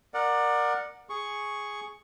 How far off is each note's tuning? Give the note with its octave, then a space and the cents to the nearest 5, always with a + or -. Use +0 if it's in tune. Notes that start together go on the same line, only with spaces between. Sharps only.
A#4 +0 D5 +20 F#5 -15
G#4 +0 C#6 +0